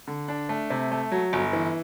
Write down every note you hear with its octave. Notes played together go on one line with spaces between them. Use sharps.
D3
D4
A3
C3
A3
F#3
G1
E3